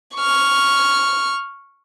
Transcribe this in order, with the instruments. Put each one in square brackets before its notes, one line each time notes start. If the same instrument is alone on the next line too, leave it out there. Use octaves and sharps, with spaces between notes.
[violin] C#6 F6